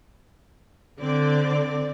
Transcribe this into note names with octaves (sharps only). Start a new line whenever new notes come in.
D3 C4 D5